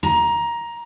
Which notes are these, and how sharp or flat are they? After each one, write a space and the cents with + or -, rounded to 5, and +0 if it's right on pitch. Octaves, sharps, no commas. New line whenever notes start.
A#5 +15